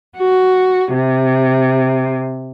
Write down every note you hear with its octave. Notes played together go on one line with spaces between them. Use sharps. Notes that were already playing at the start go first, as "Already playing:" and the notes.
F#4
C3